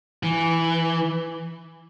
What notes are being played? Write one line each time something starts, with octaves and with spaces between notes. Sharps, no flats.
E3